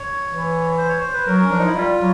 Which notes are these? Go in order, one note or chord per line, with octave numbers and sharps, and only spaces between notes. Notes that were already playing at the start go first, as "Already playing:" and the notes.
Already playing: C#5
E3
C5
C#5
C5
B4
F#3 A#4
C#4
F3 D4
D#4
E4
G3 F4
F#3